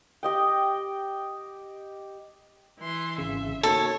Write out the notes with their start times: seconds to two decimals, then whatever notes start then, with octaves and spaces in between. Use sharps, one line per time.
0.23 G4 D#5 G5
2.80 E3 C6
3.18 G#1 C#3 E5
3.63 A#3 D#4 F#4 A4 C#5